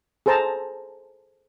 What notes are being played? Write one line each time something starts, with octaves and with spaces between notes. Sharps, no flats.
G#4 A4 C5 A5 A#5